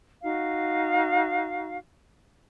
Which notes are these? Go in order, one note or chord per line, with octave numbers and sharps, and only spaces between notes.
D#4 F#4 F5